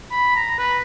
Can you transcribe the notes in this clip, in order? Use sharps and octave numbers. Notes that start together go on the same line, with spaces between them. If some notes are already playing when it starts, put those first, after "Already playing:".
B5
A#5
B4